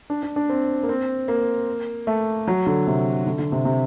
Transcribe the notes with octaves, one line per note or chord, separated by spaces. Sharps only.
D4
D4
D4
C4
A#3
C4
A#3
A3
F#3
D3
C3
D3
D3
C3
C3